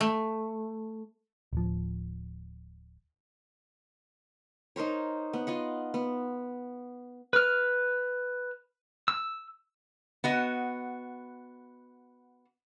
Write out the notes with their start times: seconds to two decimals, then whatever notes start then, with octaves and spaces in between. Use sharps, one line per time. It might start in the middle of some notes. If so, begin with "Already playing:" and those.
0.01 A3
1.53 D1 F3
4.76 D#4 A#4 C5 C#5
5.33 B3
5.47 F4 D#5 F#5
5.94 B3
7.33 B4 F6
9.08 E6
10.24 B3 F#4 D#5